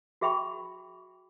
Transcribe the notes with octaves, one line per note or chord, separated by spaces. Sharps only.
F#4 G#4 E5 G5 B5 C#6